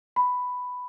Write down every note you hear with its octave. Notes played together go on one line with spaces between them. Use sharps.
B5